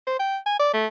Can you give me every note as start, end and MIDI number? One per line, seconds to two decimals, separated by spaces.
0.07 0.17 72
0.19 0.37 79
0.46 0.57 80
0.59 0.72 74
0.73 0.87 57